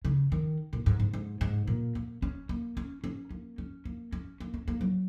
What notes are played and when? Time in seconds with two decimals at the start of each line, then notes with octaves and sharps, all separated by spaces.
0.05 C#3
0.32 D#3
0.73 A#2
0.86 G#2
1.00 G#2
1.14 G#2
1.41 G#2
1.68 A#2
1.95 A#3
2.22 C#4
2.49 A#3
2.77 C#4
3.04 C#4
3.31 A#3
3.58 C#4
3.85 A#3
4.13 C#4
4.40 A#3
4.54 C#4
4.68 A#3
4.81 F#3